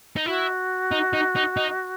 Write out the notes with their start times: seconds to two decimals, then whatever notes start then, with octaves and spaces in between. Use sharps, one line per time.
0.16 D#4
0.26 E4 F#4
0.92 D#4
1.13 D#4
1.36 D#4
1.57 D#4